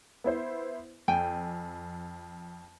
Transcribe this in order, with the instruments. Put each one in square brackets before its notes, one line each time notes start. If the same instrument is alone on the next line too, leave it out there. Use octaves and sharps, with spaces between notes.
[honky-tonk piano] B3 E4 C5
[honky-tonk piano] F2 [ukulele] G5 G#5